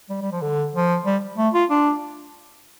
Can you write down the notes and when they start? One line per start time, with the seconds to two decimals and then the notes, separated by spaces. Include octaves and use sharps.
0.10 G3
0.22 G3
0.32 F3
0.42 D3
0.74 F3
1.06 G3
1.37 A3
1.54 F4
1.70 D4